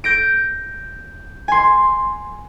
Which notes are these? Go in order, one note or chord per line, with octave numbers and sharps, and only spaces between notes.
G6 A#6 D7
G#5 C6